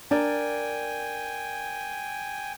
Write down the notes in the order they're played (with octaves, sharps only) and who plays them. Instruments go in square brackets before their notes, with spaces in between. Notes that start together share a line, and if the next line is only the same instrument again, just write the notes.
[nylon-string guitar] D4 A#4 D5 [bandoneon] G5 G#5